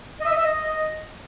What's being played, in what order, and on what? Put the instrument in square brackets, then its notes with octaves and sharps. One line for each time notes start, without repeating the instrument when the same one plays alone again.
[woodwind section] D#5
E5
D#5
E5
D#5